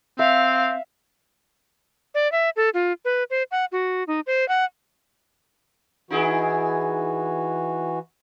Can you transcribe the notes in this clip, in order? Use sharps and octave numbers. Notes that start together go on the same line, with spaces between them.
C4 E5 F5
D5
E5
A4
F4
B4
C5
F#5
F#4
D#4
C5
F#5
E3 D#4 E4 F#4 G#4